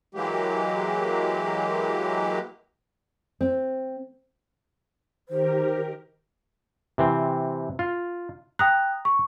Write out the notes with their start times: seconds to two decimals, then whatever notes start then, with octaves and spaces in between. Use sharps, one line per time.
0.15 E3 F#3 G#3 A#3 G4
3.41 C4
5.29 D#3 G4 A#4 C5
6.98 C3 E3 C4
7.79 F4
8.59 G5 A#5 D#6 F#6
9.05 C#6